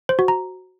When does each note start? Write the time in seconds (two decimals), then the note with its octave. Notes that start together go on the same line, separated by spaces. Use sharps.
0.09 C5
0.19 F#4
0.28 A#5